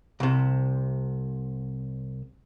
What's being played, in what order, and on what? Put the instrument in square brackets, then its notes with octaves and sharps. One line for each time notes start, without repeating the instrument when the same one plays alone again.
[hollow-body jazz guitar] C2 C3